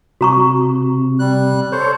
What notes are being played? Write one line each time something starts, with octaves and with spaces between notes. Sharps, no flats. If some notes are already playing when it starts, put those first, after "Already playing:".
C3 F#4 A#5 C#6
G3 F#6
A4 C5 C#5